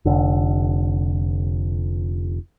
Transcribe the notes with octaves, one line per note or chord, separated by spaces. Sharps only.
F1 D3